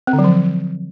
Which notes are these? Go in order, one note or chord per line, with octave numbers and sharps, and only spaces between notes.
C4
D3
F#3
F3